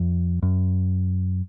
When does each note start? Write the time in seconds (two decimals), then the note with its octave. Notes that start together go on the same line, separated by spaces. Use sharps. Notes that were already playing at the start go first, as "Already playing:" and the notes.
Already playing: F2
0.42 F#2